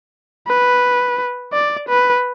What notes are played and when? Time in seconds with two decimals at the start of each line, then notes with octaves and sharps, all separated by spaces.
0.47 B4
1.53 D5
1.88 B4